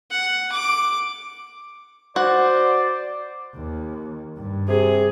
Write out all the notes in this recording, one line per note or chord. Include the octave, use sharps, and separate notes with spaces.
F#5
D6
F#4 C5 D5 F#5
D#2
G2
C3 G#4